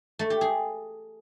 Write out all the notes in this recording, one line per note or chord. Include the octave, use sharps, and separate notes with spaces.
A3
G4
G#4